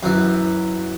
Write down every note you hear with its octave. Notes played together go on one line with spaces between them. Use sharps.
F#2 E3